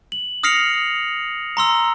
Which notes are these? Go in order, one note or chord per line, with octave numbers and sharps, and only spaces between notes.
F#7
D#6 F6 A#6 C7 C#7 F7
A#5 C6 E6